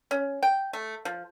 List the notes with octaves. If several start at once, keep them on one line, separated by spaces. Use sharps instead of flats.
C#4
G5
A3
F3